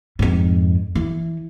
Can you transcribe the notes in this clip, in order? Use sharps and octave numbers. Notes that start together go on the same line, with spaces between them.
F2 G#2
E3